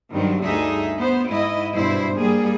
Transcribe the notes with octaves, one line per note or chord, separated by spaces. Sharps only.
G2 D#3 F#3 C4
D2 G2 D3 D#4 G#4 E5
B3 C5
G#2 E4 D#5
G2 B2 E4 C5
G3 A#3 G#4